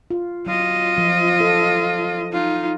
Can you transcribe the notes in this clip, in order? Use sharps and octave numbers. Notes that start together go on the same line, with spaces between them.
F4
F#3 F4 D#5
F3
A4
D#4 F4